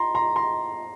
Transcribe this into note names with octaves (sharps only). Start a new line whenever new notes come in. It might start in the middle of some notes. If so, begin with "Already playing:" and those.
Already playing: A#5 C6
A#5 C6
A#5 C6